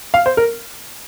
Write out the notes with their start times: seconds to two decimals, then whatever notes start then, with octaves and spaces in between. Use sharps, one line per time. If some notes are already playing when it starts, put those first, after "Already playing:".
0.14 F5
0.26 C5
0.37 A#4